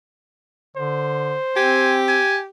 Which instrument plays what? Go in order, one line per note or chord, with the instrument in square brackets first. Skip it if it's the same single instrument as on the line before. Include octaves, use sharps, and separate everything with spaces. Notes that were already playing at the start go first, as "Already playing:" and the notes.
[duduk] D3 [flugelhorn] C5
[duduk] C4 [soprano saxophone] G4 [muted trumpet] G#5
[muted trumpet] G#5